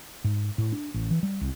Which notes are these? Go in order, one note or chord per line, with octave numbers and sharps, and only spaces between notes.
G#2
A2
D4
A1
E3
G3
C2